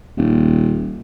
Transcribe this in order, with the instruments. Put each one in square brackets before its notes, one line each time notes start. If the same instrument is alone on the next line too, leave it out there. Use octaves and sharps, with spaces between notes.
[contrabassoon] D#1